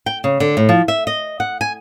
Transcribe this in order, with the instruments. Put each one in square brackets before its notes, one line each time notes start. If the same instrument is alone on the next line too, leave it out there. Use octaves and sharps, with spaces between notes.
[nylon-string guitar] G5
C#3
D3
A2
F3
E5
D#5
F#5
G#5